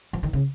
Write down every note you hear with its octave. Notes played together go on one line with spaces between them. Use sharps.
F3
D#3
C#3